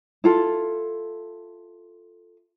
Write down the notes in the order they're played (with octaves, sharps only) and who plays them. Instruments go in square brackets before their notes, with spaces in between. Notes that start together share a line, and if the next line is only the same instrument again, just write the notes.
[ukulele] E4 F4 A4